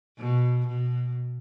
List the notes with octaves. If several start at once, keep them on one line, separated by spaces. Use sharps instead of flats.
B2
B2